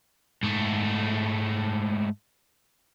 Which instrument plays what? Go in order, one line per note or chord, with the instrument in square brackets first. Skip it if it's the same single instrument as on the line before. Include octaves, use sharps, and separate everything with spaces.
[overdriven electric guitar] G#2 A3